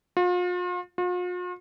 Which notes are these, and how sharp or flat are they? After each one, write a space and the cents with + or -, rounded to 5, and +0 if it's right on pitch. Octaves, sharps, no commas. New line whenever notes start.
F4 +40
F4 +45